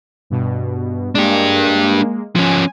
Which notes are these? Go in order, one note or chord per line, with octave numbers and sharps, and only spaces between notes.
G2 B2
G#3 A#3 D4 G4
F3 C#4 G#5